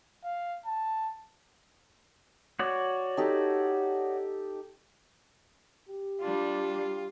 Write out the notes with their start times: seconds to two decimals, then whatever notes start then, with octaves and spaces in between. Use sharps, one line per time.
0.25 F5
0.66 A5
2.59 F#4 C#5 D5
3.17 D#4 G4 A4
5.89 G4
6.22 G3 D4 F4